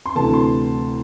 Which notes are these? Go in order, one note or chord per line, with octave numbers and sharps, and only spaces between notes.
C6
D2 C3 E3 A3 A5
C6